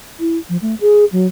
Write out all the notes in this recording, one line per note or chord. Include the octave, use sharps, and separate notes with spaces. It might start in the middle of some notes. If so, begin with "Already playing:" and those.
E4
F3
A3
G#4
F#3